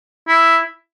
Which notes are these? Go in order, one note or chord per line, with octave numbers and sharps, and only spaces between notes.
E4